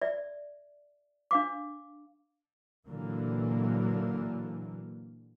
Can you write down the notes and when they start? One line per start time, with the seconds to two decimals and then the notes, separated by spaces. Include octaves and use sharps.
0.02 D5 E5
1.31 D4 F5 D6
2.88 A#2 D3 E3 F#3 A#3